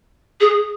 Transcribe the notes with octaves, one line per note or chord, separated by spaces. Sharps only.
G#4